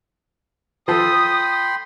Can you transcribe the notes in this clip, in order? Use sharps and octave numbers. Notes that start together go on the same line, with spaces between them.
F3 A4 G5 B5 C6 D#6